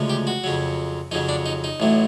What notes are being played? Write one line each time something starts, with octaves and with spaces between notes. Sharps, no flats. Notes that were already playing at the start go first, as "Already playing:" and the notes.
Already playing: D2 C#3 F3 G#3
G4
F#4
F2 C#3 F#3
F2 C#3 F#3 D#4
D4
D#4
D#4
A1 A2 F#3